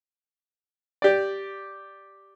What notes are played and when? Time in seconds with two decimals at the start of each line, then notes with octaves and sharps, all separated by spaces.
1.02 G4 D5